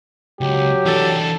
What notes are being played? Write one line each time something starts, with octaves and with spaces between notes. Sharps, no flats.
C#2 F#3 G4
E3 D4 A4